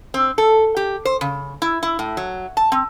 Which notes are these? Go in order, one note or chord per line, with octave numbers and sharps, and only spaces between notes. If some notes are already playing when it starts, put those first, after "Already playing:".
C4
A4
G4
C5
C#3
E4
E4
A2
F#3
A5
C4